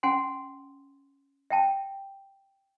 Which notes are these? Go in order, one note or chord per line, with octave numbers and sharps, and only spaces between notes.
C#4 F#5 G#5 C6
E5 G5 A5